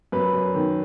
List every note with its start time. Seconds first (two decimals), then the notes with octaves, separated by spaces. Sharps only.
0.12 F#2 B4
0.33 F#2
0.54 D#3